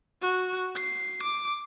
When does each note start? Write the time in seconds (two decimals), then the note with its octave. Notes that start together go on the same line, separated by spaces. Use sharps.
0.22 F#4
0.76 C7
1.23 D6